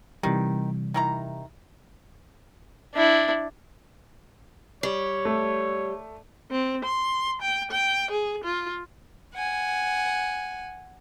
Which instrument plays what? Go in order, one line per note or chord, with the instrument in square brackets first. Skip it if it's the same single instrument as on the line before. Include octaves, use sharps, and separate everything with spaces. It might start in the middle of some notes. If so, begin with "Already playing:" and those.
[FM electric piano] C3 E3 G3 [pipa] D#3
[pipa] D#3 E4 A#5
[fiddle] D4 E4
[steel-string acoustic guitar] G3 [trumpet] C#5
[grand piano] A3
[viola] C4
C6
G5
G5
G#4
F4
[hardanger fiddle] F#5 G#5